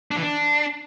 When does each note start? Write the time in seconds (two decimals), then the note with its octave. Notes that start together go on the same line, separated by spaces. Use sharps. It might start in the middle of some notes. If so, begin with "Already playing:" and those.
0.11 D4
0.17 E3
0.22 D4